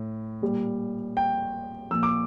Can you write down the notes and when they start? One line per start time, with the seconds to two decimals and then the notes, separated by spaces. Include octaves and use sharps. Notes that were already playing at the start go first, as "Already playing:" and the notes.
Already playing: A2
0.42 A#2 G3
1.17 G5
1.91 A#2 F3 E6
2.03 D6